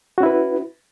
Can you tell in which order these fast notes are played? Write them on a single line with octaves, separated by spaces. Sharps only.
F#4 C#4 E4 B4